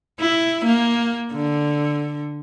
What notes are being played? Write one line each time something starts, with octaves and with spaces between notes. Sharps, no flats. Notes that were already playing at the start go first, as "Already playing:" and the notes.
E4
A#3
D3